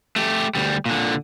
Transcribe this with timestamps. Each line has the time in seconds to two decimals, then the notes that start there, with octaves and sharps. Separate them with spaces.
0.16 A3 G4
0.55 D2 G3
0.86 A#2 D3